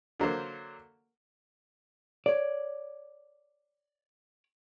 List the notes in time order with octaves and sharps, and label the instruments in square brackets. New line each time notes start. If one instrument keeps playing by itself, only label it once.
[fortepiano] D3 F#3 A#3 C5
[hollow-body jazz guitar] C#5 D5